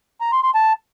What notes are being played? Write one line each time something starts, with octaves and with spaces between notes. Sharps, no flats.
A#5
C6
C6
A5